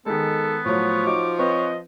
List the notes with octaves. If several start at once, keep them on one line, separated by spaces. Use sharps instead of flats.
D#3 G#3 B3 A4
A2 F3 F#3 C#5
D#4 F#4 D6
C4 B4 C#5 D#5